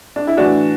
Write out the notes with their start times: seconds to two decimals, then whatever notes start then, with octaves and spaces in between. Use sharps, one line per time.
0.16 D4
0.27 E4
0.37 A2 E3 D4 F#4